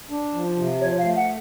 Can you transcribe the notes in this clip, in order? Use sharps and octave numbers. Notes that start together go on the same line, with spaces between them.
D4
F3
C3
F3 C#5
F5
A3
F#5